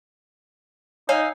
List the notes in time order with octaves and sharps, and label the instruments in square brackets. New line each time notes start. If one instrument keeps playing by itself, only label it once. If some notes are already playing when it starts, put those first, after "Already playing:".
[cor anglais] D#4 [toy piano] C#5 [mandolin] F5 G#5 E6